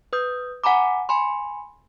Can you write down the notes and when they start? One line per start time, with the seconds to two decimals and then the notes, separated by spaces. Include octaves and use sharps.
0.13 B4 D#6 G6
0.64 F#5 G#5 A#5 B5 D6
1.09 G#5 B5 C6